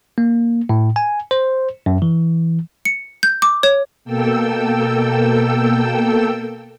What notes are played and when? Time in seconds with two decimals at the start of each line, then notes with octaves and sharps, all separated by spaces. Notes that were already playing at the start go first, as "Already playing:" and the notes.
0.18 A#3
0.69 A2
0.96 G#5
1.31 C5
1.86 F#2
2.02 E3
2.85 C#7
3.23 G6
3.42 D6
3.63 C#5
4.05 B2 A#3 A4 G5 E6